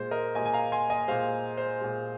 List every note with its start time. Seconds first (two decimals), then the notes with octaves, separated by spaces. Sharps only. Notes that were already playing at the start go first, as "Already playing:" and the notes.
Already playing: A#2 G#3 C5
0.11 A#4 D#5
0.35 A#2 G#3 D#5 G#5
0.46 G#5
0.53 F5 A#5
0.72 G#5 C6
0.90 D#5 G#5
1.08 G#3 C5 F5
1.11 A#2
1.58 C5
1.81 A#2 G#3